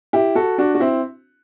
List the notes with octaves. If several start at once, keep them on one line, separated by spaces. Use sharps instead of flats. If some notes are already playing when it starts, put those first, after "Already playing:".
E4 G4
F#4 A4
D4 F#4
F#4
C4 E4